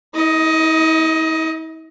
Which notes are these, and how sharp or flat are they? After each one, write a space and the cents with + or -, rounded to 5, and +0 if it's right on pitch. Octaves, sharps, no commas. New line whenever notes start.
E4 -45 D#5 +15